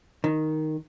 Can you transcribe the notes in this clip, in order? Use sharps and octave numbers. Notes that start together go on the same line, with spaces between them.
D#3